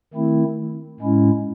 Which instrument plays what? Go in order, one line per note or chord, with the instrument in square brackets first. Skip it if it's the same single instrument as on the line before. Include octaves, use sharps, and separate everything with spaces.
[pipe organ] D#3 A3 C4 E4
A2 G#3 C#4 E4